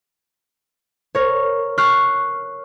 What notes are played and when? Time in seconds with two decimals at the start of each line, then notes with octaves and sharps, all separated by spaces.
1.15 A#4 C#5
1.78 C#6 F6 F#6 C7